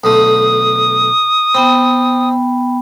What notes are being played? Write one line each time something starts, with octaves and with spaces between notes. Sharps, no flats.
B1 D3 A3 D#6
B3 C4 G5 B5